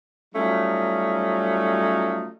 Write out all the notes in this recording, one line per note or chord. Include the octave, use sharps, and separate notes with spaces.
F#3 G3 A3 C#4 D#4 F4